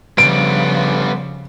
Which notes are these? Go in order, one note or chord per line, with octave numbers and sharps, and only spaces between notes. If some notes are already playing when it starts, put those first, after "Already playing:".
C#3 F3 G3 B3 D7